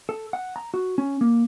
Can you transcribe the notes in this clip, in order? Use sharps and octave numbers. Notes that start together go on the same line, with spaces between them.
A4
F#5
A#5
F#4
C#4
A#3